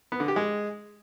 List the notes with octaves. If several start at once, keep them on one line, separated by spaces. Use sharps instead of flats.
B3
D3
G4
G#3